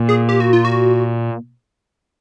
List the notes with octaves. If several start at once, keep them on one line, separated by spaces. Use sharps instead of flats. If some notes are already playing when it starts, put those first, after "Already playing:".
Already playing: A#2
G#4
G4
F#4
F4
F#4